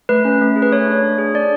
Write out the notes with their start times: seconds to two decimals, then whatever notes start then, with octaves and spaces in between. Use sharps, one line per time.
0.09 A3 B4
0.25 C#4
0.41 A3
0.56 G#4
0.62 B4
0.72 A3 C#5
0.87 D4
1.04 A3
1.18 G#4
1.34 D4 D5